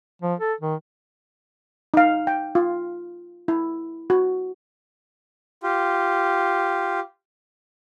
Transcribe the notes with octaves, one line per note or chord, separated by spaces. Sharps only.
F3
A4
D#3
D#4 F5
G5
F4
E4
F#4
F4 G4